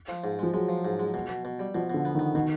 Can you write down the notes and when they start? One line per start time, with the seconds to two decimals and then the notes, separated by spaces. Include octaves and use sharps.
0.09 F3
0.24 G#2
0.39 F3 G#3
0.54 F#3 G#3
0.69 F3
0.85 G#2
0.99 G#3
1.14 B2
1.29 B2
1.45 B2
1.59 G3
1.75 B2 F3
1.90 B2 D3
2.05 B3
2.15 D#3
2.19 B3
2.35 B2 D#3